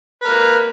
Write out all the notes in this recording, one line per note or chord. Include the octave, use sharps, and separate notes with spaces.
A#3 A#4 B4